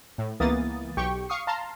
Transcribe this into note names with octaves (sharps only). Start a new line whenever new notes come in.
A2
C#2 E3 A#3 B3 D#6 A6
B1 G4 G5 C#6
F5 C#6 D#6 C7
F5 A5 A#5 C6